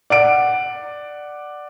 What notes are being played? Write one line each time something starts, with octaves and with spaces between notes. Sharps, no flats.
D5 F#5 D7